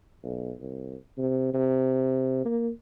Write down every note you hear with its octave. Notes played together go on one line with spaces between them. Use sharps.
B1
C2
C3
C3
A#3